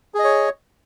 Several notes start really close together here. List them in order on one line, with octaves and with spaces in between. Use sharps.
G#4 D#5 C#5